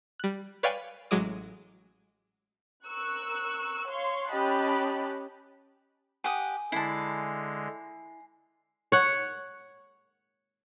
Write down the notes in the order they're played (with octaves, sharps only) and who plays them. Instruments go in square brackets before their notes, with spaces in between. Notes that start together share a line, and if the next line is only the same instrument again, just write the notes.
[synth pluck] G3 F#6
B4 C#5 D5 F5 G5 G#5
A1 F#3 G#3 D6 D#6
[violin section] A#4 C#6 E6 F#6
C#5 F5 C6 C#6
C#4 G4 D#5 A5 B5 F#6
[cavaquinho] G4 F#5 D#6 [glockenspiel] G#5
[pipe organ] D3 G#3 [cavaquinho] E4 A5 [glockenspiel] C7
[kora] C#5 F#5